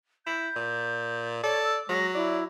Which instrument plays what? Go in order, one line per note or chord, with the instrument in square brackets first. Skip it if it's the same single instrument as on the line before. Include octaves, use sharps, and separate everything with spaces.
[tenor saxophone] E4 [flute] G6
[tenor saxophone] A#2
[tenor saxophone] A4 [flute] C#5 [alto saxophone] D5
[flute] E6
[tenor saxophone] F#3 [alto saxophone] G#3 [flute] A#6
[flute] E4 [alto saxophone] D5